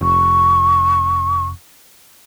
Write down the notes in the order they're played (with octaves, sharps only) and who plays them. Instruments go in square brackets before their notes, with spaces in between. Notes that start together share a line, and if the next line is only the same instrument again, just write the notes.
[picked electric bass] F1 [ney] C#6